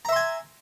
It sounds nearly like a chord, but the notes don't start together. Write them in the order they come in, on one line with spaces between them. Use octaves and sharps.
A#5 E5 C6 G#5